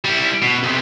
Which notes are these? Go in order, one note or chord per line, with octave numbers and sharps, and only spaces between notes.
G3 E4
B2
B1 C3